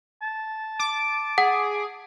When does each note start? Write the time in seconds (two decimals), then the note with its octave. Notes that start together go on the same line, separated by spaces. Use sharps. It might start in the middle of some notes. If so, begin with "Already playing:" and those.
0.22 A5
0.79 D6
1.38 G#4 F#5